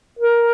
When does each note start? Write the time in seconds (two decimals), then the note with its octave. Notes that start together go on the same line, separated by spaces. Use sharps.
0.19 A#4